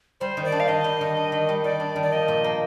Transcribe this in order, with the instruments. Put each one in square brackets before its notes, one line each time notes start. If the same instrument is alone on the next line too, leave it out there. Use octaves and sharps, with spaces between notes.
[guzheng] G3 [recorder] C5
[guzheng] D#3
[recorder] D5
[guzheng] D4
[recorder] F5
[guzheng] D#3 [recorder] D#5
[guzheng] G3
D#3
D4
D#3
G3
[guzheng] D#3 [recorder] D5
[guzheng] D4
D#3
[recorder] D5
[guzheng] F3 [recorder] D#5
[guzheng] A#2
A#3